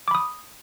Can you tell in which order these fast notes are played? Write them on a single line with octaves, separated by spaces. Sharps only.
D6 B5 D#6